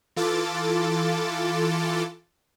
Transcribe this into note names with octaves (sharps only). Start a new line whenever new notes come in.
E3 F4 A4 D6 A6